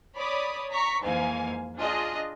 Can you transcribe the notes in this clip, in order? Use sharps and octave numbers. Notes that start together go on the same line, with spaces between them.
C#5 D5 B5 D6 D#6
A#5 C#6 B6
F2 G#2 E3 A#3 F5 G#5
D4 F4 G#4 D#5